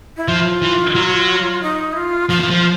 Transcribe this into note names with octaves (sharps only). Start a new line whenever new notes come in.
E4
F3 F4
E3
F#3
D#4
E4
F4
F3 F4
E3
F3